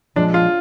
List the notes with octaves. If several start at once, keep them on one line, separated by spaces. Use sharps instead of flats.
A#2 F3 G#3 D4
F4